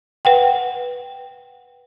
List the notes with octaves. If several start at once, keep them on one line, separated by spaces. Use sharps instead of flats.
B4 F#5 G5